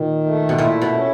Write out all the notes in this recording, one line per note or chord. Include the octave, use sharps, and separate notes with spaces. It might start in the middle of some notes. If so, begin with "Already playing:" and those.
Already playing: A#2 D#3
A3
B2
A#2 E4
B2
C#4